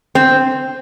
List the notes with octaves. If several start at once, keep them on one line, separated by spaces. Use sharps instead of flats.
C4